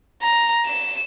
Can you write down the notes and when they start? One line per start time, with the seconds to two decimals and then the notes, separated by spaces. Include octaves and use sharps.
0.22 A#5
0.66 E7